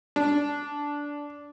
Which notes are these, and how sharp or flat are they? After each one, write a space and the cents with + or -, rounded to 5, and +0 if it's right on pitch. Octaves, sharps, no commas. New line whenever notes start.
D4 -10